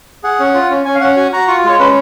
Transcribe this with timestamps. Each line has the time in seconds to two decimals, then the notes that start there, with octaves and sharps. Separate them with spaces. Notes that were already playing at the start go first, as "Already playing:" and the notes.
0.24 G#4 F#5
0.40 C#4
0.54 F4
0.70 C#4
0.85 C#4 G#5
0.95 F5
1.01 C#4 F#5
1.16 F#4 G#5
1.32 F#4 A#5
1.48 F4 C#6
1.64 G#3 C#5
1.79 C#4 B4